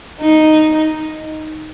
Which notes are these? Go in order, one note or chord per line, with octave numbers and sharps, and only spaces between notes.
D#4